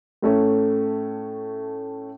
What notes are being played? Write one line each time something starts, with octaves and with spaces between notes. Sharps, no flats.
A2 A3 C#4